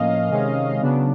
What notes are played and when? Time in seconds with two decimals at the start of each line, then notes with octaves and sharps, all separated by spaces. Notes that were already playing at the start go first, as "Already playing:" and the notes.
Already playing: A2 F3 A#3 C#4 D#5 F5
0.29 C3 D#3 G#3 C#4
0.81 C#3 F#3 B3 D4